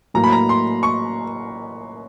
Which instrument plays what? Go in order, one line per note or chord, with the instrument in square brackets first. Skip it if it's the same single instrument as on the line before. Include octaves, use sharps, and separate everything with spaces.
[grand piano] A2 F#3 A#3 [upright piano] A#5
[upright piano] B5
A#5
C6
C#6